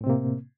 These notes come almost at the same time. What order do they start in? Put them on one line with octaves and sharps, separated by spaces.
A2 C4 C3 A#3